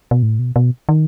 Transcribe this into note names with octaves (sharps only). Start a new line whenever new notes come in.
B2
A2
B2
B2
D#3